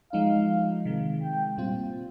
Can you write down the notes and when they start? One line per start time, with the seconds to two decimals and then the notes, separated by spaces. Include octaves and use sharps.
0.13 F3 G#3 D#4 F5
0.85 C3 D#3 G#3
1.22 G5
1.58 A#2 G3 C4 F4